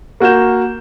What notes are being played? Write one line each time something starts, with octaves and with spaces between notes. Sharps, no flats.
A#3 F#4 A#4 G6 E7